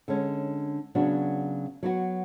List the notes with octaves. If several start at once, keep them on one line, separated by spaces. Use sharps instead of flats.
D3 G#3 C#4
C#3 F#3 B3 D4 F#4
F#3 B3 F#4